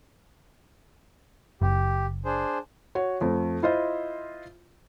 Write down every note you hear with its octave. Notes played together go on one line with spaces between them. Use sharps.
F#1 G4
D4 G#4 C5
F#4 C#5
F2 A3
E4 F4 C5 D#5